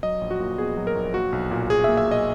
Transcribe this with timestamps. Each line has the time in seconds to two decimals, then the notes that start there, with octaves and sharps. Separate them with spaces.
0.03 F#3 D#5
0.21 A#1
0.31 F#4
0.40 A#2
0.58 B3 G#4
0.77 F#3
0.87 A#4
0.95 A#1
1.14 A#3 F#4
1.32 B1
1.51 A#2
1.70 B1 G#4
1.84 E5
1.89 A#3
1.97 E5
2.07 B1 D#5